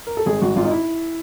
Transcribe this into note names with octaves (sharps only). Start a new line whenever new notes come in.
A#4
A4
G#1 G#4
G#1 F#4
G#1 F4
D#4
E4